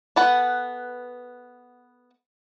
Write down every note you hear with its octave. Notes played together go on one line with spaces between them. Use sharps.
B3 A4 B4 F#5